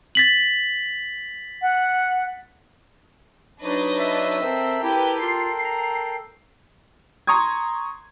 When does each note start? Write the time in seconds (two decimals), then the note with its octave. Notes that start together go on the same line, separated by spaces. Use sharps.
0.15 A6 B6 F#7
1.62 F#5
3.63 F#3 D4 D#4 B4 C#5 D#5
3.99 E5
4.42 C4 A4 A#4 G5
4.83 E4 G4 B4
5.23 F4 C7
5.64 A#5
7.27 A#5 C6 C#6 D#6 G#6